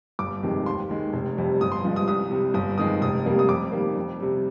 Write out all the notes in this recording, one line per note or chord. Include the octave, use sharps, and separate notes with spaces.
G1 D6
F2 C3 D#3 G#3
D#2 C6
D#3 G#3
F1
F2 C3 G3
G1 D#6
C6
G2 F3 G#3
D#6
C2 D#6
C3 G3
G1 D#6
F2 D#3 G#3 D#6
F1 D#6
F2 C3 G3 A#3
D#6
F2 D6
D#3 G3 A#3
F2
C3 G3